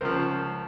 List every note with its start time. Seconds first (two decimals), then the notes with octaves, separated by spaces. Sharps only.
0.01 C#2 C#3 F3 A#4 C5